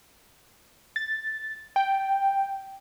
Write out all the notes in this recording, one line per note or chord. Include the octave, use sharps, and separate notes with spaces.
A6
G5